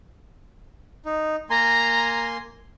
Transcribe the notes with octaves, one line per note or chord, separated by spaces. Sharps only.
D#4
A#3 G#5 A#5 C6